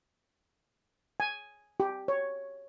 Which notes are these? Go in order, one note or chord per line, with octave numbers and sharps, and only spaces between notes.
G#5
G4
C#5